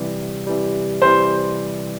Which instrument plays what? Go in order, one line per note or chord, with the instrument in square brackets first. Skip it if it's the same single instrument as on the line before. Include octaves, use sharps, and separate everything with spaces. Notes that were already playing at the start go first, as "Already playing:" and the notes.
Already playing: [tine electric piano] C3 E3 G3
C3 E3 G3
[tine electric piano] C3 E3 G3 [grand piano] C5